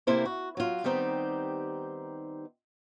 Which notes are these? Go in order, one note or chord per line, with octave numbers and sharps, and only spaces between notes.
C3 A#3 E4 A4 C5
F#4
F#3 F4
D#3 G3 B3 C4 D#4 G4